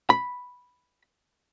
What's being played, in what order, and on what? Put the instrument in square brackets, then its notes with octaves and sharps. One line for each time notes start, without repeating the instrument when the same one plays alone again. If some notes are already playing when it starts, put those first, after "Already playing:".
[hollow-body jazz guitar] B5